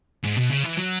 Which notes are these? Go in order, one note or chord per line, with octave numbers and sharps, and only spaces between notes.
G#2
B2
C#3
E3
F#3